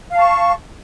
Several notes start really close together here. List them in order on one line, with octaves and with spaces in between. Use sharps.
F5 A5 C#6